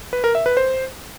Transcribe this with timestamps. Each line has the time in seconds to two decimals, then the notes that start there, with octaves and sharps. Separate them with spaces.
0.13 B4
0.24 A#4
0.35 E5
0.46 B4
0.57 C5